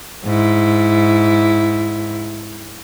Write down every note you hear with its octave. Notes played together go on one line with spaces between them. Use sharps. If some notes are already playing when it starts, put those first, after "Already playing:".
G#2 E4